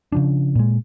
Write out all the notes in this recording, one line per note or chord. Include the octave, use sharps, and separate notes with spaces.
C#3 F3 D4
A#2 G#3